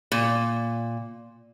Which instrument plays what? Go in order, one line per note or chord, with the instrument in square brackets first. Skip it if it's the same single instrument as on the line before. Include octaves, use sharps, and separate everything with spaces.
[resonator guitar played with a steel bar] A#2